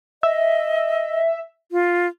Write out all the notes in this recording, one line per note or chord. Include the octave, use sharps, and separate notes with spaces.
D#5 E5
F4